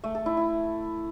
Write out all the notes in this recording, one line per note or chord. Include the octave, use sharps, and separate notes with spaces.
A3
A4
E4
E4